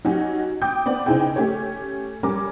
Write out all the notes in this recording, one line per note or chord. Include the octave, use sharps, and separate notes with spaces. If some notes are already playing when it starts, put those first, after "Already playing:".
F#3 C#4 D#4 F#4 G4
G5 D6 D#6 G6
B3 C4 D5
C#3 C4 D#4 E4 G#4 G5
A3 C#4 G4 C#5
G3 C#4 A#4 D6